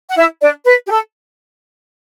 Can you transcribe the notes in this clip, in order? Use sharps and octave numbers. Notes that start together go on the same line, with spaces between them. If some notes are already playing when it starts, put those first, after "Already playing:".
F#5
E4 E5
D4 D5
B4
G4
A4